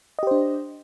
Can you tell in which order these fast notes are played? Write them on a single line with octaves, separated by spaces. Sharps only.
D#5 G4 C5 D4